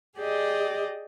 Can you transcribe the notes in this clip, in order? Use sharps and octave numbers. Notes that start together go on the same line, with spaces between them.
G4 G#4 D5 D#5